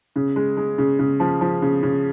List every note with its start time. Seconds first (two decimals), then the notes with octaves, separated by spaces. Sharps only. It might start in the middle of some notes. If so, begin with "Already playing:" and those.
0.16 C#3
0.36 G#3
0.57 G#3
0.78 C#3
0.99 C#3
1.20 F3
1.41 F3
1.62 C#3
1.83 C#3